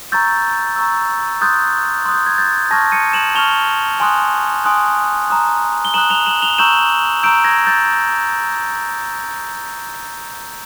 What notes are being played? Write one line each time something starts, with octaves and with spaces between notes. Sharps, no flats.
A#5 C#6 E6 G6 A6
A#5 C#6 E6
C6 D#6 F#6 G6 A6
C6 D#6 F#6
G6
G#6
G6 A6
A5 C#6 F6 G#6 A#6
C#7 D#7
E7 F#7
A5 C#6 F6 F7 G7
G#5 C6 D#6 F#6
G#5 C6 D#6 F#6
A#5 D#6 F#6
G7
A#5 D#6 F#6 E7 F#7
F7 G7
E7 F#7
F7 G7
A#5 C#6 E6 G6 E7 F#7
A#5 C#6 E6 G6 D7 E7
G#6 A#6
G6 A6